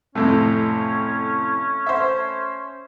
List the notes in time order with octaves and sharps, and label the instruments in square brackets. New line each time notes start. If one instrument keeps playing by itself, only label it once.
[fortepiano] F2 A2 C3 [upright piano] A3 [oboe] C#4
[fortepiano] C5 E5